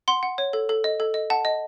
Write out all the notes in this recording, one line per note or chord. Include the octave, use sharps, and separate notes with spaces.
F#5 C6
F#5
C#5
A4
A4
D#5
A4
D#5
F#5 A5
D#5